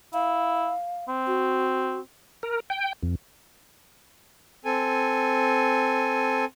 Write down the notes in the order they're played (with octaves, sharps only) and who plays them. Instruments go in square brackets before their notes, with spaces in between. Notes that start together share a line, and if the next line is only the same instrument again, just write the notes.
[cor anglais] E4 [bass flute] F5
[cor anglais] C4
[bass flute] F#4
[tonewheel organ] A#4
G5
F2
[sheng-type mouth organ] C4 A4 G#5